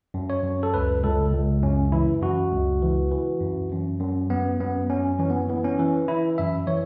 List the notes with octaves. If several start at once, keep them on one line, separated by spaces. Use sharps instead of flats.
F#2
C#5
F#2
A4
C#2 B4
C#2 A4
C#2
F#2 C#4
E3 E4
F#2 F#4
C#2
E3
E3
F#2
F#2
F#2
F#2 B3
F#2 B3
F#2 C#4
E3 C#4
B3
E3 B3
C#4
E3
E3 E4
F#2 E5
E3 C#5